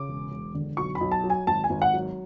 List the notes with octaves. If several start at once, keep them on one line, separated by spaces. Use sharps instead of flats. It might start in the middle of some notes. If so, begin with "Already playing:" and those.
Already playing: C#3 D6
E1
E1
D3
B1 C#6
B5
B1
A5
F#3
G#5
G#1 A5
G#5
G#1
F#5
F#3